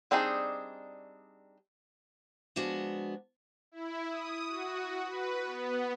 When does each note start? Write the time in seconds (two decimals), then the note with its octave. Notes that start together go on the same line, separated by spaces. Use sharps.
0.11 G3 C4 D4 D#4 G#4
2.56 F3 G#3 B3 D4 F#4
3.72 E4
4.10 D#6
4.47 F#4
5.05 B4
5.44 B3